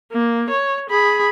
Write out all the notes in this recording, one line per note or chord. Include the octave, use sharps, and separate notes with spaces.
A#3
C#5
G#4 B5